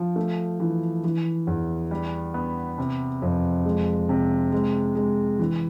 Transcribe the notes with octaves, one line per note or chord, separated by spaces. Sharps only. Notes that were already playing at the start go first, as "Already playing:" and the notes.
Already playing: F3
A3
E3
E3
E2
G3
B3
C3
F2
G#3
C3
G#3
G#3
E3